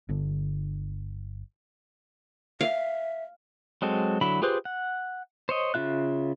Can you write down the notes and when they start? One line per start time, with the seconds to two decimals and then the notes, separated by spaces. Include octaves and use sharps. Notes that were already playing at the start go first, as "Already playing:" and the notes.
0.09 G1 D3
2.61 E5 F5
3.82 F#3 G#3 C4 A4
4.21 D3 F#3 E4 B5
4.42 F4 G4 G#4 B4 C5
4.65 F#5
5.49 C5 C#5 D#5
5.74 C#3 G3 F4 E5 F#6